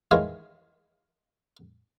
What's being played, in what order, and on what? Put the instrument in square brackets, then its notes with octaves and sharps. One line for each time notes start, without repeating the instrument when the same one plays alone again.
[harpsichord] D#3 E3 G#3 F4 C#5 F5